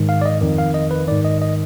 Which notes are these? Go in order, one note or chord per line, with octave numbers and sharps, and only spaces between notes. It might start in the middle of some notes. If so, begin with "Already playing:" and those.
Already playing: G#2 D#3
F5
D5
D#5
F2 D#3
F5
D#5
B4
G#2 D#3 D5
D#5
D#5